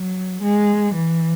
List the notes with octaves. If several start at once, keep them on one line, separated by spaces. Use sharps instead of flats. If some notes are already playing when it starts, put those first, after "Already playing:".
Already playing: F#3
G#3
E3